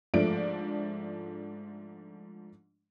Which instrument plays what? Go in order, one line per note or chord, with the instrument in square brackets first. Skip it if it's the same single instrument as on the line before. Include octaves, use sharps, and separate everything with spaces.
[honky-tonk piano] G#2 F3 A3 D4 D7